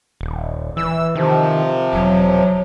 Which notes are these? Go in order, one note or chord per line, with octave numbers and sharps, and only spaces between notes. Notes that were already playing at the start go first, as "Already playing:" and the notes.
D#1
E3 E6
C3 D#3 F3
E1 F#3